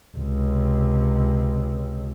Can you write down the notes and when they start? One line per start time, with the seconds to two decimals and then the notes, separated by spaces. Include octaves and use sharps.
0.17 C#2 C3